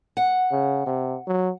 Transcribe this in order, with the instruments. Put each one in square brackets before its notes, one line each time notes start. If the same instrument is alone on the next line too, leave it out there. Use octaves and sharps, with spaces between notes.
[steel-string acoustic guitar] F#5
[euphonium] C#3
C3
F#3